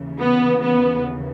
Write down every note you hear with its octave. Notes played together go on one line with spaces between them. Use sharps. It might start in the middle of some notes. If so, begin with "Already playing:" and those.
Already playing: D#2 C#3 E3
B3
B3